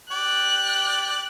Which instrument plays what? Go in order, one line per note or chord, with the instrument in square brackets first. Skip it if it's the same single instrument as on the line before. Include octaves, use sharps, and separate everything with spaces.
[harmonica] G4 D5 G5 [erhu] F#6